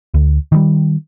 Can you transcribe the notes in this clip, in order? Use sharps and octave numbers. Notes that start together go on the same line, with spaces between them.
D2
D#3 E3 G3